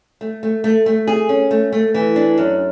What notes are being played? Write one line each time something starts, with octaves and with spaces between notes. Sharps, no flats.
A3
A3
A3
A3
G#4
C#4
A3
A3
E3
D4
F#2